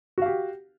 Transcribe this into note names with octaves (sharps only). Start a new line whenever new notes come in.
F#4 G4 F5